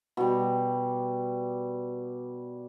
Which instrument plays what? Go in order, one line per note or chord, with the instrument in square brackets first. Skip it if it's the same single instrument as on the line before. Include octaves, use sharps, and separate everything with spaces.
[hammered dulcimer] B2 G3